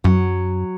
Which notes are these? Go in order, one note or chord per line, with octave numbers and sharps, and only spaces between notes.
F#2 F#3